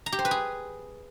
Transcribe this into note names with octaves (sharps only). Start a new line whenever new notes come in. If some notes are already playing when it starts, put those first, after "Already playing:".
A#5
G4
C5
B4
G#4